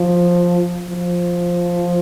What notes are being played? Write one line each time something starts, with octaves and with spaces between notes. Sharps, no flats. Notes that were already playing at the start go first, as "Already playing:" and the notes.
Already playing: F3
F3